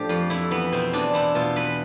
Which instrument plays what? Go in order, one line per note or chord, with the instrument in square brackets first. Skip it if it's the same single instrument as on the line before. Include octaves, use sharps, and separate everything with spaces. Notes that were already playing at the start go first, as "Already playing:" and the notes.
Already playing: [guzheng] A2 F3 D4 G4
F2 F4
F2 E4
E3 B3
B2 C4
E2 D4
E2 E4
B2 F4
E3 B4